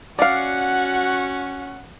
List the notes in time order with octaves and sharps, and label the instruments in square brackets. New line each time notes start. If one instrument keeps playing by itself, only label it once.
[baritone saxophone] C#4 [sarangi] F#4 [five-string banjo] D5 F5 [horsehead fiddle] F#5